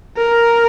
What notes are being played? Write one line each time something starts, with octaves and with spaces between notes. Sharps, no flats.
A#4